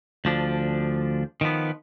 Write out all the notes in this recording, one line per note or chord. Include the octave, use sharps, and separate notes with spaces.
D2 F3 D4
D#3 F3 B3